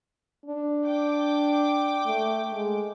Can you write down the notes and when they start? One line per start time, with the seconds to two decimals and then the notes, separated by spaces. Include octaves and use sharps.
0.46 D4
0.86 G5 D6
2.06 A3
2.53 G#3